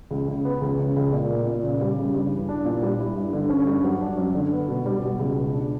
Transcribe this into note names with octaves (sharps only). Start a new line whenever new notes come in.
C#2
C#3
B3
C#2
C#3
C#2
A#2
A#3
A#2
C#3
G3
C#3
G2
E3
D4
A#2
G3
E4
G2
D3
C#4
G2
F#3
D4
F#2
D3
B3
B2
G3
B2
C#2
B2
D4